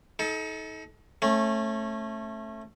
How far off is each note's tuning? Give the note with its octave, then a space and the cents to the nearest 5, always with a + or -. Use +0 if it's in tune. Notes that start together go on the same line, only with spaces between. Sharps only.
D#4 +30 A4 -25
A3 +0 C#4 -30